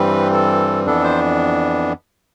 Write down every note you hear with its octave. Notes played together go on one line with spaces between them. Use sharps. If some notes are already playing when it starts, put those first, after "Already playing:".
Already playing: G2 E3 G3 C4 B4
A4
F2 E3 B3 D4 A4
C5